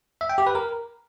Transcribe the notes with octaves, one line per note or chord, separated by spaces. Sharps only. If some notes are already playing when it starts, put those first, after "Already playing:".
E5
G5
G4
B4
A#4